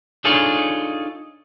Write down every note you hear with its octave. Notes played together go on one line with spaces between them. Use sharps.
D4 D#4 F4 G#4 A4 C#5